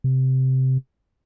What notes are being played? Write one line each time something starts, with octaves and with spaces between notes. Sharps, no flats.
C3